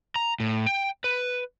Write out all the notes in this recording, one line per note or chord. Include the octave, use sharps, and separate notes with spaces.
A#5
A2
G5
B4